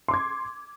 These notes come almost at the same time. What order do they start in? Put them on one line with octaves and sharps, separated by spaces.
C6 D6 G#6